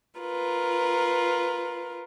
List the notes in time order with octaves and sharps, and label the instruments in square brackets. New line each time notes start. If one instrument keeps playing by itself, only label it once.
[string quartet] F4 A#4 B4